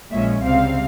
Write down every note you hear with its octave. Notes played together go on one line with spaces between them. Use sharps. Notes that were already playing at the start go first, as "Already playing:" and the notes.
A#1 A#2 G#3 C#4 E5
C#2 C3 G3 C4 F5